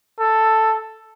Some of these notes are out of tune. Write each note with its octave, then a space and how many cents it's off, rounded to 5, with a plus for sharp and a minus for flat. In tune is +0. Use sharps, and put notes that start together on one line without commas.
A4 +5